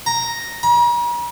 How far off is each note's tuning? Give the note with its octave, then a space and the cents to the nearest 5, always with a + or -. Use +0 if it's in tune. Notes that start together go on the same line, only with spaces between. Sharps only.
A#5 +0
A#5 +45